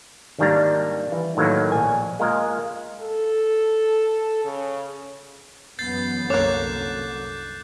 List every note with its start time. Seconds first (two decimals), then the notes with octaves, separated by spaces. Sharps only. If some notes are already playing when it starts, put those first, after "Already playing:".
0.38 G#1 D#3 G3 A#3 D4 A#5
1.12 E3
1.37 A2 D#3 F#3 A#3
1.72 A#1 G#5
2.19 G#3 A#3 F4 A#4 D#5
3.01 A4
4.45 C#3
5.79 F#2 E3 B3 G6 A6 C7
6.30 C2 F#2 D3 A#3 C#5 D6 F#6 G6